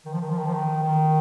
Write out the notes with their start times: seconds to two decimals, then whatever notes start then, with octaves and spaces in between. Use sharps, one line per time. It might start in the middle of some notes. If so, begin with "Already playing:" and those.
0.05 D#3
0.13 F3
0.21 D#3
0.30 F3
0.38 D#3
0.46 F3
0.54 D#3
0.83 D#3